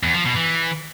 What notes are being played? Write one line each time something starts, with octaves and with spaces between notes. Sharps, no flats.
E2
F3
B2
E3